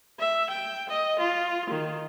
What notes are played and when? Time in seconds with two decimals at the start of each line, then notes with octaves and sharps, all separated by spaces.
0.19 E5
0.50 G5
0.89 D#5
1.19 F4
1.70 D#3